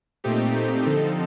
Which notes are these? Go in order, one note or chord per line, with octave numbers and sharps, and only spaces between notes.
A#2 A3 C4 D#4 G4
D3 F3 C4 D#4 A4